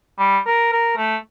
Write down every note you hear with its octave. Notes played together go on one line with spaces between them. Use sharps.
G3
A#4
A#4
A3